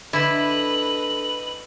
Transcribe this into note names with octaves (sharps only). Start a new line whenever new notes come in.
D3 E4 B4 D#5 F#7